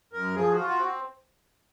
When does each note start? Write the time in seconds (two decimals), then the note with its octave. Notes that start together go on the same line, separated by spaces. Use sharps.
0.13 F#2 A#4
0.35 F3 G#4
0.51 F#4
0.57 F4
0.67 F#4
0.78 C4